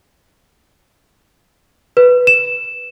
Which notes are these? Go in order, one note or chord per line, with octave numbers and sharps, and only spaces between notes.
B4
E7